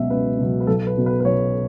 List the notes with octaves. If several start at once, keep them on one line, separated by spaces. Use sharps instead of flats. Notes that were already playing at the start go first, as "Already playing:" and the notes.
Already playing: C#2 B2 F#3 E5
C#2 B4
B2 F#3
B4
B1 A4
B4
B2 F#3
B4
B4
B1 C#5